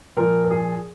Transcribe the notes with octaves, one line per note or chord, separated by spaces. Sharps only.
A#2 F3 A#4
A#4
G#4